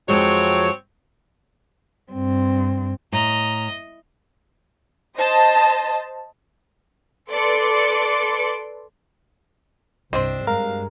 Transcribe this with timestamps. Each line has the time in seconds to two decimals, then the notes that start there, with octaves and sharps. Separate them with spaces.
0.09 F2 F3 F#3 G#3 C4 C#5
2.12 G2 C4
3.12 A2 D#5 A#5
5.17 C5 D#5 A5
7.30 A4 B4 D5 C6 D6 C#7
10.13 C2 G2 C4 D4 C5 D#5
10.47 G2 G#3 A#4 F5